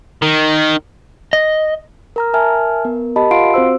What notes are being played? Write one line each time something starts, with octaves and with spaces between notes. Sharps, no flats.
D#3
D#5
A#4 A#5 F6
A#4 E5 G#5 A5 F6
B3 A#4
G4 A#4 D#5 A5 B5
F4 F5 F#5 C6 C7 D7
C4 F#4 C5 E6